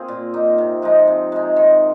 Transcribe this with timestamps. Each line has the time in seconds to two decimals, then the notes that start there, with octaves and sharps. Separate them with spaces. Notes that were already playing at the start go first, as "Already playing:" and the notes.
Already playing: A#3 C4 F4 G#4 C5
0.08 A#2
0.34 A#3 D#4
0.58 C3
0.82 F3 G#3 D#4
1.07 C3
1.32 G#3 D#4
1.56 D#3